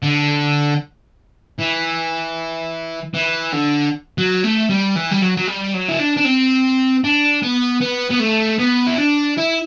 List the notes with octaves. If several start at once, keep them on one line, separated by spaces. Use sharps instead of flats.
D3
E3
E3
D3
F#3
A3
G3
E3
G3
F#3
F#3
G3
F#3
E4
D4
D4
C4
D4
B3
B3
B3
A3
B3
E4
D4
E4